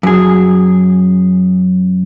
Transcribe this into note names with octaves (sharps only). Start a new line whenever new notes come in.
F#2 G#4